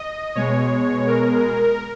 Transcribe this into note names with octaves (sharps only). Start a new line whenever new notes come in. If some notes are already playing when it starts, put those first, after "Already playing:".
Already playing: D#5
B2 G#3 C#5
A#4